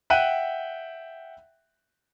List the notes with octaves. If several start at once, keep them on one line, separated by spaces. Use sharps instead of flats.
E5 F#5 G5 F#6 D#7